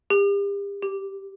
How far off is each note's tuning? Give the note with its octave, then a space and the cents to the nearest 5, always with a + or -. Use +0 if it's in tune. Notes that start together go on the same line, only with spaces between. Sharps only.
G4 +40
G4 -5